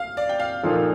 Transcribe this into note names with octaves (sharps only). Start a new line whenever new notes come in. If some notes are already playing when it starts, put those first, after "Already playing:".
Already playing: F5
D5
G5
F5
A#2 F3 A#3 D#4 A4